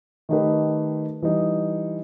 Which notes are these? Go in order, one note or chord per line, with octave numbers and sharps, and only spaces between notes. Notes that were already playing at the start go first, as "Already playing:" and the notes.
D#3 A3 D#4 G4 B4
E3 G3 D#4